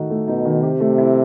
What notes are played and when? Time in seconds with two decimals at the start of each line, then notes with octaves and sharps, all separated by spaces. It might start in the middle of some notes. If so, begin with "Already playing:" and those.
Already playing: D#3 A3 D#4 F#4
0.10 A3
0.28 B2 D#4
0.45 D#3
0.63 C3 G4
0.80 A3
0.98 E4